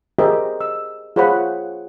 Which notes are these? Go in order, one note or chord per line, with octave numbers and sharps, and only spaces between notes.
G4 G#4 A#4 C5 D#5 E5
D#5 E6
F4 G#4 C5 C#5 F#5 B5